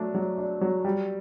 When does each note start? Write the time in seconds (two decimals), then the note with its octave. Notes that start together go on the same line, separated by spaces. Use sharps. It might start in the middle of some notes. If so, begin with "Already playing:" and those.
Already playing: F#3 A3 D4
0.14 F#3
0.38 D4
0.61 F#3
0.85 G3